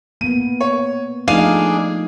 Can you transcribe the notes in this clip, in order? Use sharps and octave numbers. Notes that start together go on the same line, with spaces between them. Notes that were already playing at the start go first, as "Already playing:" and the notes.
A#3 B3 D#7
C#5
F3 A3 D4 D#4 G#4 F5 D#7